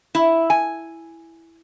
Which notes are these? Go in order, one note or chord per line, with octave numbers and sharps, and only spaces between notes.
E4
G#5